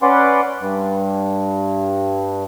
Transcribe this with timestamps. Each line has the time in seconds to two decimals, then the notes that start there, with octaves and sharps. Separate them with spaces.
0.02 C#4 B4 D5 F#5 C6 D6
0.60 G2